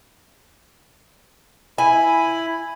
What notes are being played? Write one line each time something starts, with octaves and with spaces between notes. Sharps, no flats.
E4 G#5 B5